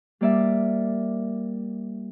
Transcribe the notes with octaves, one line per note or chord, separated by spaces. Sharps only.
G3 A#3 D5 E5